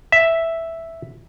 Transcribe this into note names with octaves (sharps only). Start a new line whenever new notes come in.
E5